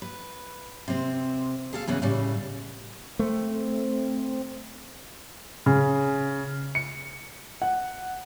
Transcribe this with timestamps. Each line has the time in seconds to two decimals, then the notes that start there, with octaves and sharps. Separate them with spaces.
0.02 B4
0.88 C3 C4
1.73 G#4 A4 F5
1.87 C#3 E3 B3 G#4
2.02 A2 C#3 G3
3.19 A3 C4
5.66 C#3
6.75 C#7
7.62 F#5